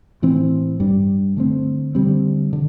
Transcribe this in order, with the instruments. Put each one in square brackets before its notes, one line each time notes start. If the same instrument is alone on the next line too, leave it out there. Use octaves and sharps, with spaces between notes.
[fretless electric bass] A2 E3 C4
G2 G3 D4
D3 A3 C4
D3 G3 C4
D3